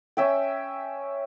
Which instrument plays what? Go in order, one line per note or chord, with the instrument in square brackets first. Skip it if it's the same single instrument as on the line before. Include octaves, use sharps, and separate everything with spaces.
[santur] C#4 E5 G5